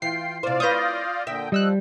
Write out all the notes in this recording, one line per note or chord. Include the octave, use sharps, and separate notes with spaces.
E3 F4 G5 C7
C3 F4 C5 D5 F5
B4 C#5 D#6 G6 A#6
A#2 D3 E5 G5
F3 G3 D#5 E6 F#6